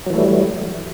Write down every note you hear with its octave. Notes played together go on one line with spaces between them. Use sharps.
E3 F#3 G3 A3